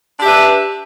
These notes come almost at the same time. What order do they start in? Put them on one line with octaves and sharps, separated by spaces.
D4 G4 E5 B4